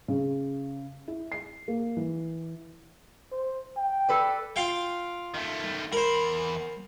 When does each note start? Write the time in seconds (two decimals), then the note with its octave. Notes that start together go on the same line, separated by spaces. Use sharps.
0.08 C#3
1.08 E4
1.32 C7
1.68 A#3
1.97 E3
3.32 C5
3.77 G5
4.09 A4 B4 D5
4.56 F4 F5 G5
5.34 D#3 A3
5.93 E2 A#4 C5 B5